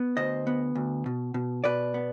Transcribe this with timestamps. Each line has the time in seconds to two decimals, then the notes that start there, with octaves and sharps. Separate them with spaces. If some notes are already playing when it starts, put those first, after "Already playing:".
Already playing: B3
0.17 D2 C5 D#5
0.47 B3
0.75 D2
1.06 B2
1.34 B2
1.64 B2 B4 D5
1.94 B3